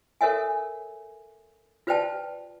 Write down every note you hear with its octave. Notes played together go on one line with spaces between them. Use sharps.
A4 A#4 C#5 E5 G#5
F4 B4 C5 D5 G5 A5